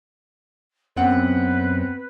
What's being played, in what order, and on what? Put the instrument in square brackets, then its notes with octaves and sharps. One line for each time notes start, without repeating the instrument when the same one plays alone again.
[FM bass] F#2 [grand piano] B3 C4 F#5 [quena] B4